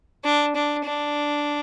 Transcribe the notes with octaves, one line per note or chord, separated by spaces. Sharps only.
D4
D4
D4